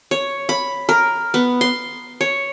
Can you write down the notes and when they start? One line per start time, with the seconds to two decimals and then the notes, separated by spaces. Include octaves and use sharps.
0.11 C#5
0.49 B5
0.89 A#4
1.34 B3
1.61 C6
2.21 C#5